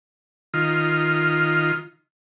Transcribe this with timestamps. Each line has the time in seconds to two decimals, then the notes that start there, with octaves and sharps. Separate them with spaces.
0.54 D#3 F4